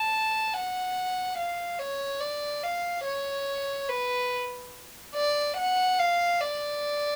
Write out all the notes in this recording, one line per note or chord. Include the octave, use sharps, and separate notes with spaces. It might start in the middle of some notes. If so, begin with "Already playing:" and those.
Already playing: A5
F#5
F5
C#5
D5
F5
C#5
B4
D5
F#5
F5
D5